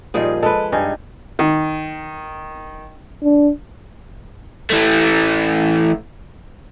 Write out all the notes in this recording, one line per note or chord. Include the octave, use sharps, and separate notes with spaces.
A#2 F3 G3 D#4 F4 G#4
G#3 A4 B4
G2 D#4 G#5
D#3
D4
E3 A3